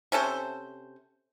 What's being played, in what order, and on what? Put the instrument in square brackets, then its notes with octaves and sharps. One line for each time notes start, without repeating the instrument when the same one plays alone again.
[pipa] C3 C#4 A4 C5